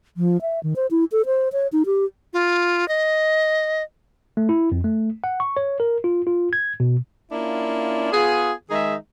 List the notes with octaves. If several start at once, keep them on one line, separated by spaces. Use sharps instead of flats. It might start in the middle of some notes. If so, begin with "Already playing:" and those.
F3
E5
D#3
C5
E4
A4
C5
C#5
D#4
G4
F4
D#5
A3
E4
F2
A3
F#5
C#6
C#5
A#4
F4
F4
G#6
B2
A#3 C#4 D4 E4 F4
B3 F4 G#4
D#3 G#3 D#4 G#4 E5